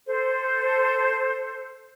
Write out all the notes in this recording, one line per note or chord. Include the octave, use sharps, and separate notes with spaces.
A4 C5